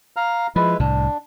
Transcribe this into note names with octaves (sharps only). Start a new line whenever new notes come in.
F5 A#5 F6
F3 G#3 E4 B4
C2 A2 D4